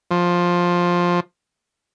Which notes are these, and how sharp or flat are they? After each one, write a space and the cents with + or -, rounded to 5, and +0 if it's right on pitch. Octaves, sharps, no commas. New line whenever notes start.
F3 +10